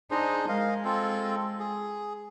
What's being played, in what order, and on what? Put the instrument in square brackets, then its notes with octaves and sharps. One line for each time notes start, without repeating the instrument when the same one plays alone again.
[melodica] D4 G#4 C5 [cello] D#4
[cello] G#3 [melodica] A#4 D#5 F5
[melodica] C4 F4 A4
G#4